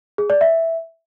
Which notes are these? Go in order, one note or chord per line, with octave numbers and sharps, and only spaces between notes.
G#4
D5
E5